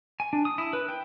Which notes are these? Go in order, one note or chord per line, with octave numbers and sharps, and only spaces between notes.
G#5
D4
D#6
E4
B4
G5